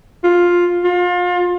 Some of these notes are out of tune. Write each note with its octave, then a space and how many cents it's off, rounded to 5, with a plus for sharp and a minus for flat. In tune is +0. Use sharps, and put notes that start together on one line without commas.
F4 +10
F4 +35